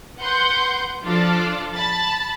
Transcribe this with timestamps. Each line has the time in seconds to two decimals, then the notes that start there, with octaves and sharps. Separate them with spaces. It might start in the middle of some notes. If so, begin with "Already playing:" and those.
0.20 B4 F#5 C6 G6
1.03 F3 D4 F4 A4 D5
1.75 A5 B5 A6